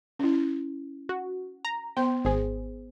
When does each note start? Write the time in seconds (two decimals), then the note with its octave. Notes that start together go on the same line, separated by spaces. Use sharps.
0.19 C#4 E4
1.09 F#4
1.65 A#5
1.97 B3 C5 G5 C6
2.25 G#1 G#4 C5